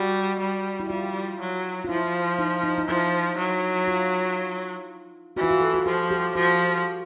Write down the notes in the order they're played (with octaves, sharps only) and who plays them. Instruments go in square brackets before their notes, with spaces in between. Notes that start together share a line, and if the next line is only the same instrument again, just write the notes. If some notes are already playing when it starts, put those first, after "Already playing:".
Already playing: [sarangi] G3 [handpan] F#4
[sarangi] G3
[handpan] E4
[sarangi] G3 [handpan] F4
[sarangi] F#3
[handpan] F4
[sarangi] F3 [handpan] E4
[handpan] D#4
D#4
D#4
[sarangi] F3 [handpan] E4
[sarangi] F#3
[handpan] F4
[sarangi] E3 [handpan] F#4
[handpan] F4
F#4
A4
F#4
[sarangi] F3 [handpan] G4
[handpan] G4
[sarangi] F3 [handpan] F#4